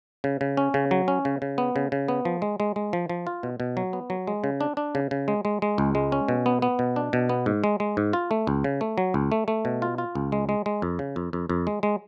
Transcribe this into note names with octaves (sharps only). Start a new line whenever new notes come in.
C#3
C#3
C#4
C#3
F#3
C#4
C#3
C#3
B3
C#3
C#3
B3
F3
G#3
G#3
G#3
F3
F3
F4
B2
B2
F#3
B3
F#3
G#3
C#3
D4
D4
C#3
C#3
G#3
G#3
G#3
C#2
G#3
C#4
B2
B3
B3
B2
D4
B2
B3
G#2
G#3
G#3
G#2
F4
A3
C#2
C#3
A3
F#3
C#2
A3
A3
B2
F4
F4
C#2
G#3
G#3
G#3
F2
C#3
F2
F2
F2
G#3
G#3